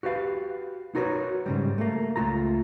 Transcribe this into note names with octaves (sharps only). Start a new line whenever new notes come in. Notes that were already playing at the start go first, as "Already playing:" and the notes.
F#4 G4 B4 F5
D#4 F#4 A#4 B4 C#5
G#2 C#3 G3
A3 A#3
C#2 A3 F4 A#5